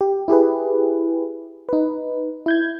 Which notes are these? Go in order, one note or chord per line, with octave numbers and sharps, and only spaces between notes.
G4
E4 G4 G#4 B4
D#4 B4
E4 G6 G#6